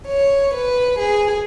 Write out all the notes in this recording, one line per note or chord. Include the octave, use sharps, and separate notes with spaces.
C#5
B4
G#4